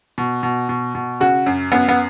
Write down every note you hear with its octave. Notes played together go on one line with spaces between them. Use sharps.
B2
B2
B2
B2
C#3 F#4
F#2
F#2 B3
B3